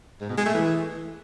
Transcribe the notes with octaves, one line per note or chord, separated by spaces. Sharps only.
G#2
B2
G#3
A3
E3